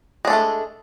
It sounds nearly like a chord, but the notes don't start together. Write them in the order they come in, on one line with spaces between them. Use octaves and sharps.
G#3 D4 A4 A3